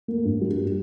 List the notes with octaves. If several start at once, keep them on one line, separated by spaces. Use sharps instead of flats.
A#3
G2
G3